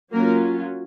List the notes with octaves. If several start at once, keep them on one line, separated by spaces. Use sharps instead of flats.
F#3 A#3 C#4 F4 A#4